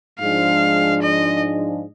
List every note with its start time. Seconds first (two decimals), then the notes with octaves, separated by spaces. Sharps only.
0.19 G#2 F3 G#3 D4 F5
1.02 D#5